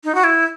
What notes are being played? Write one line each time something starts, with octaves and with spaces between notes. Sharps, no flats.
D#4
F#4
E4